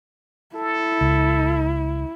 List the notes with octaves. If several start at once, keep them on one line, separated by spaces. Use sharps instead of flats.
E4 A4
C#2